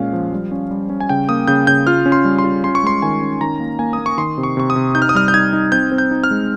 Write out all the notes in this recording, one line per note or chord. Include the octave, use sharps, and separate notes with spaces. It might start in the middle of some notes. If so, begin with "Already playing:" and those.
Already playing: A#2 G#3 C#4 F5
F3
G3
C#4
G3
C#4
G#5
C#3 G5
A#3 D#6
C#3 G6
C#3 G6
F4 F6
C#4
C6
G3
C6
F4
C#4 C6
C#6
G#3 C6
D#3 G#5
C#4
D#3 A#5
A#3
A#3 G#5
D#6
A#3
C#6
D#3 C6
C3
C#6
C3 C#6
D#6
C3
D#4 G6
F6
D#6
G3 F6
G6
D#4 G#6
D#4
C4 G6
C4
G6
D#4
F6
G#3